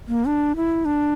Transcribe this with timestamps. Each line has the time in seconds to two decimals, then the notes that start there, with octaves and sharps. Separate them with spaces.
0.08 A#3
0.27 D4
0.56 E4
0.85 D4